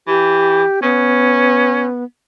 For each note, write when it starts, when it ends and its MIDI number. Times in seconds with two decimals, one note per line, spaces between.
0.07 0.63 52
0.07 0.82 67
0.83 2.04 59
0.83 1.85 61